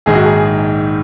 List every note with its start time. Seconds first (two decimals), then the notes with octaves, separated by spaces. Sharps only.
0.06 A#1 G#2 D#3 G#4
0.15 F#4
0.24 G#4